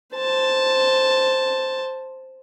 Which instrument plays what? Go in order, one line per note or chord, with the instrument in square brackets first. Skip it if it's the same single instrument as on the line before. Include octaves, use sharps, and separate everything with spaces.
[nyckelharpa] C5 A5